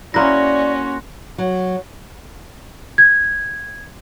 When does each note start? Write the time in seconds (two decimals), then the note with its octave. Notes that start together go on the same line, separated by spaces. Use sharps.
0.14 A#3 C#4 E4 F#4 D5 C6 F#6 A#6
1.38 F#3
2.98 G#6